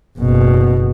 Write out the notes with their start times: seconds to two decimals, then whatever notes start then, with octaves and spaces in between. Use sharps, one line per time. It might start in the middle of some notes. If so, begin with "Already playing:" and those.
0.18 F#1 B2